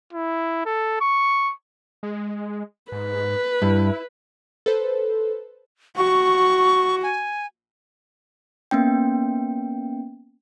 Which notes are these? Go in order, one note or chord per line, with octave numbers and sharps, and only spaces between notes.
E4
A4
C#6
G#3
G#2 B4
G2 E4
A4 B4 C5
F#4 C#6
G#5
A#3 B3 C#4 G5